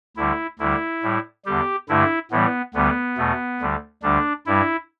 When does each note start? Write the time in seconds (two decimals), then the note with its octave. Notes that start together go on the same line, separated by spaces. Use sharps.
0.17 D2 D3 G3 E4
0.59 D2 D3 G3 E4
1.03 A2 G3
1.45 E2 D3 G3 G4
1.89 G2 D3 A3 E4
2.31 A2 E3 G3 B3
2.74 D2 D3 G3 B3
3.17 E2 B2 A3
3.61 D2 D3 G3
4.03 D2 D3 G3 D4
4.46 G2 G3 E4